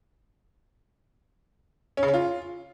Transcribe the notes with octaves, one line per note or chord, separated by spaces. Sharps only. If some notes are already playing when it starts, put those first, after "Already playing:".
C#4
C#3
C#4
F4